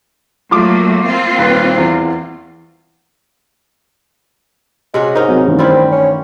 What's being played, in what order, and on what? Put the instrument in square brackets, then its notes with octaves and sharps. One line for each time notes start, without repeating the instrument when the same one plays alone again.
[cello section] F#3 A3 A#3 [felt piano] F4 D6
[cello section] A#3 C4 F4
[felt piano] D#1 B4
E2
[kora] C3 C#4 F#4 [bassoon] G#3
[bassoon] G#2 [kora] C#4 D#4 [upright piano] A#4
[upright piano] C3 F#3
A1 G2 D#3
[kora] G3 E4 F4 [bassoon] C4
[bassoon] C#4